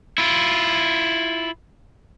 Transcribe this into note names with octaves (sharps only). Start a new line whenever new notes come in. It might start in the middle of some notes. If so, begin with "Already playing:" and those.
E4 F4